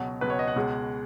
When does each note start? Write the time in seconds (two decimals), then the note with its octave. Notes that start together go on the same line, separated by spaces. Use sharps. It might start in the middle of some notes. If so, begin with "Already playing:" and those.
Already playing: C#2 B2 F#3
0.21 C#2 B2 F#3 B4
0.30 C#5
0.39 D#5
0.48 F#5
0.56 C#2 B2 G#3